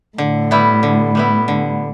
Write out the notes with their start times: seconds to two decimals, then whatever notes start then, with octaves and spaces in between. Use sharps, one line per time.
0.18 A2 D3
0.51 G3 B3 E4
0.83 D3
1.15 G3 B3 E4
1.48 D3